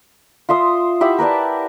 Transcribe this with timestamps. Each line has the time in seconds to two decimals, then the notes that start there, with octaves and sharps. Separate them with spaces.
0.49 F4 E5 C6 D#6
1.01 E4 G4 E5 F#5
1.18 A#4 B4 D5 A5